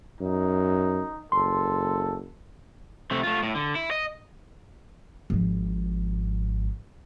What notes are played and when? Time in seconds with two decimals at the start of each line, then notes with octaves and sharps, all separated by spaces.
0.20 F#2 D#4
1.32 F#1 A4 C6
3.11 C3 A3
3.23 A3 F4
3.43 A2
3.55 D3
3.75 E4
3.91 D#5
5.30 G#1 F3